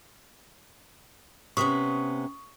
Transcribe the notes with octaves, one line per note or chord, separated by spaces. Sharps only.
C3 B3 C#4 C#6 D#6